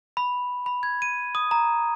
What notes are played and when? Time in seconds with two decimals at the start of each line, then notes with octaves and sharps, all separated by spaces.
0.17 B5
0.66 B5
0.83 G#6
1.02 D#7
1.35 D#6
1.51 A#5